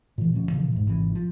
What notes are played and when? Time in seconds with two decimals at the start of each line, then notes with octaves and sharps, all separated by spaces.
0.18 A#2 E3
0.33 D2 F3 C4 C#4
0.51 A#2 C#3 E3 F3
0.72 D#1 G#2
0.87 G#1 C3 E3
1.15 F3